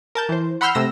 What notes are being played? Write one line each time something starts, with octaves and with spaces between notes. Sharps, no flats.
A#4 A5 G6
E3 C5
F#5 B5 C6 E6 F6 G6
C3 A3 E6 A#6